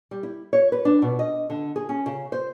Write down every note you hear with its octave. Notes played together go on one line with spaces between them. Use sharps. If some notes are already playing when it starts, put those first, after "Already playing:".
G3
E4
C#5
B4
D4
B2
D#5
D3
G#4
C#4
C#3
C5